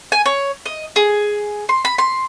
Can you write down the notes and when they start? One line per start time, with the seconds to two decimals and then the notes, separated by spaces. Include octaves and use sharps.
0.12 G#5
0.26 C#5
0.66 D#5
0.96 G#4
1.69 C6
1.85 B5
1.98 C6